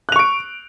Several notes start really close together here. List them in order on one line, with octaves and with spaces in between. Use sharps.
F#6 F7 C#6 D7